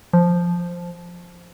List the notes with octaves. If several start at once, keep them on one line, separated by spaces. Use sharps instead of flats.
F3